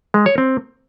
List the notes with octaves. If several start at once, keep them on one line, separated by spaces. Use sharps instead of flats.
G#3
C#5
C4